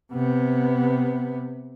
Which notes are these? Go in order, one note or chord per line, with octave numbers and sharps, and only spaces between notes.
C3 B3